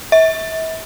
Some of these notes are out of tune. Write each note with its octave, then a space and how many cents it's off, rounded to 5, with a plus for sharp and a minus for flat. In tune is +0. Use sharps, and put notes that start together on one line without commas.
E5 -35